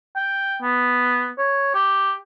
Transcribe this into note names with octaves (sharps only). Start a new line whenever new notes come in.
G5
B3
C#5
G4